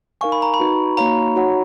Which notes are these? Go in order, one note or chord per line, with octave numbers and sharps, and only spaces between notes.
D#4 A#4 F5 G#5 C#6
B5
A#5
B5
D#4 F#4 B4
A#3 D#4 F#4 C#5 F5 A#5
D#4 F#4 C#5 F#5